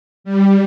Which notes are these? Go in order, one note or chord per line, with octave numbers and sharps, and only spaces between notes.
G3